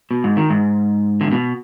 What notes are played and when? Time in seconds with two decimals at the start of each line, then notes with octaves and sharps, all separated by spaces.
0.11 B2
0.24 G#2
0.37 D#3
0.50 G#2
1.21 D3
1.31 B2